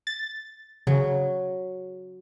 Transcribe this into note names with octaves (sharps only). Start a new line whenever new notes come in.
A6
C#3 F#3